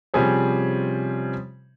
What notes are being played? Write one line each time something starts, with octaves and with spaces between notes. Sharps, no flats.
C3 F3 G3 C#4 G#4 C5